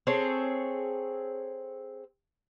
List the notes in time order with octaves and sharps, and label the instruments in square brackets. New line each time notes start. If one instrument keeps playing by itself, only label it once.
[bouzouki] C4 G#4 A4 C#5